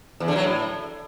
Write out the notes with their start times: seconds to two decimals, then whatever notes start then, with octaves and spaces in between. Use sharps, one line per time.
0.20 E2
0.28 D3
0.36 F#3
0.43 A2